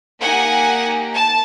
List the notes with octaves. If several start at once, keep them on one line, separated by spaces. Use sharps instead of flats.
A#3 D#4 G4 F#5 G#5
A5